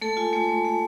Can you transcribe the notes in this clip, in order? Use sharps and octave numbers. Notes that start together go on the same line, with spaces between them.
A3 A4
F4 G#5
A3
A3
A3